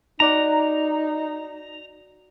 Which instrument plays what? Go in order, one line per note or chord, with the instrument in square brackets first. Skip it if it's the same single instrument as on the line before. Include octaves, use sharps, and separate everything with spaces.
[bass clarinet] D#4 [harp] F#4 D5 F#5 [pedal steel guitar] A#5